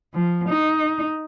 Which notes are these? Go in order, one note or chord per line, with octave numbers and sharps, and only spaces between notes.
F3
D#4